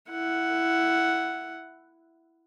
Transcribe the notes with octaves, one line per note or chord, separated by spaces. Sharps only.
E4 F#5